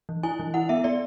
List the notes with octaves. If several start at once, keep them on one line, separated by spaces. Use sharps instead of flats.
E3
E4 G#5
E3
E4 F#5
B3 E5
B3 D5